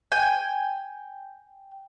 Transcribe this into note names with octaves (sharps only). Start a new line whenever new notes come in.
G5 G#5